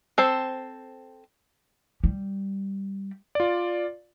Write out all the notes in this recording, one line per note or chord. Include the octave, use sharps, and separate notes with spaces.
C4 A4 C5
G3
F4 D5